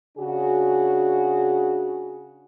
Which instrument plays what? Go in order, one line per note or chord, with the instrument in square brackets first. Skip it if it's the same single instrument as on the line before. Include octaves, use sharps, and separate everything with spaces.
[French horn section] C#3 D4 F#4 G#4